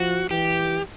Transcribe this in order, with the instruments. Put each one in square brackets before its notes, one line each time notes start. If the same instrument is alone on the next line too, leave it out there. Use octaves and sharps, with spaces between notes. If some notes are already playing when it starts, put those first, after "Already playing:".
Already playing: [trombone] F3 [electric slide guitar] F#4
[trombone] E3 [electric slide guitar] G4